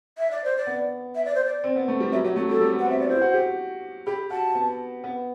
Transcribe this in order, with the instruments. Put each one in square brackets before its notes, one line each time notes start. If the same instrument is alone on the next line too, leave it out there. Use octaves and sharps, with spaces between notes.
[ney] E5
D5
C5
D5
[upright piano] B3
[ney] E5
D5
C5
D5
[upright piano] C4
B3
A3
G3
[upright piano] F#3 [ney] E5
[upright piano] F#3 [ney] G4
[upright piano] A3 [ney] F#4
[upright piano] G3 [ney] A4
[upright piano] G3
B3
[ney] F#5
[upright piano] C4
[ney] E5
D5
[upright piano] E4 [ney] C5
[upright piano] F#4
G4
[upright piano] G4 [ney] B5
[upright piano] F#4 [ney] A5
[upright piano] B3
B3